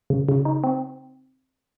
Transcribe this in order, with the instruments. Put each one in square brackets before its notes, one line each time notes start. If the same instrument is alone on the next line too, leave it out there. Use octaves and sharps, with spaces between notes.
[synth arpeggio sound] C#3
C#3
D#4
C4